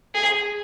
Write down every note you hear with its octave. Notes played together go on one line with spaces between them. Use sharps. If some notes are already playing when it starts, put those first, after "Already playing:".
G#4